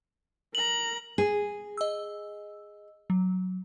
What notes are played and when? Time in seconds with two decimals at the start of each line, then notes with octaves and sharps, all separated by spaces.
0.55 A#4 A#5 F#7
1.18 G#4
1.77 D#5 E6
3.10 F#3